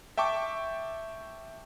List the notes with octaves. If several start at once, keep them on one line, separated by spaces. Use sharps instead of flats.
E5 G5 A5 C#6 D6